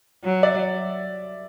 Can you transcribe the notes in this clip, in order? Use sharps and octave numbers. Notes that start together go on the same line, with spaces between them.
F#3
D5 E5